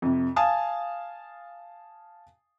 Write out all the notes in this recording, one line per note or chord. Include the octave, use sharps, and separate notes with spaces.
F2 C3
F5 G#5 A5 D#6